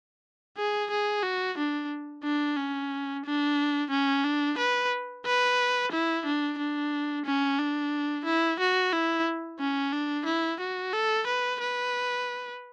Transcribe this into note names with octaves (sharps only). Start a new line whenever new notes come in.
G#4
G#4
F#4
D4
D4
C#4
D4
C#4
D4
B4
B4
E4
D4
D4
C#4
D4
E4
F#4
E4
C#4
D4
E4
F#4
A4
B4
B4